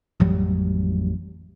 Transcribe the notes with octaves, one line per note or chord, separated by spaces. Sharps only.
A1 F2 F#3 G3